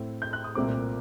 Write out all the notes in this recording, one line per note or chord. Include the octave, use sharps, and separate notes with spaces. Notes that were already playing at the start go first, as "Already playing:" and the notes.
Already playing: A2 A3 C4
G6
F#6
D#6
C2 A#2 A3 C4 D6